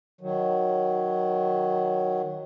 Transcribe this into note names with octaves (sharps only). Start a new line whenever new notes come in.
D#3 F#3